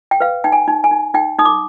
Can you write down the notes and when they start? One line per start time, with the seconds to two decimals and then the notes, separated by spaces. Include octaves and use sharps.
0.11 G5
0.20 B4 F5
0.44 D#4 G5
0.52 G#5
0.68 D#4
0.84 G#5
0.91 D#4
1.14 D#4 G5
1.39 D#4 D#6
1.45 D6